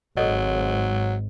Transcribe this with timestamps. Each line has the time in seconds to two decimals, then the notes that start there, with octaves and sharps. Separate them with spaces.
0.17 G#1 G#2 F#3 A4 C#5 D#5